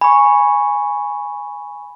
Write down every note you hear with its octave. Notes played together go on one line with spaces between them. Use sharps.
G#5 B5 C#6